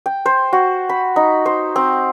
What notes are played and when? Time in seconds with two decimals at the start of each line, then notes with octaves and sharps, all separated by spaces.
0.06 G5
0.26 C5
0.53 F#4
0.89 B5
1.16 D#4
1.46 C5
1.76 C4